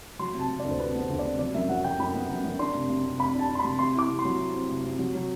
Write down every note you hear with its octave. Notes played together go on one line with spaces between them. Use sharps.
F#3 C6
C3
A5
C3
D5
D2
C5
C3 B4
B3 C5
D2 C5
D5
C3
F#3 D5
F#2 E5
F#3 F#5
F#3 G5
F#2 B5
B3
F#2
F#2
D4 C6
C3
C3
C3
C3 B5
D4
A5
D4
C6
B5
C3
C3 C6
E4 D6
C3
C6
F#3
E4
C4
C3
C3
F#3
F#3